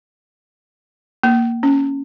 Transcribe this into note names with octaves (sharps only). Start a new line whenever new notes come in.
A#3
C#4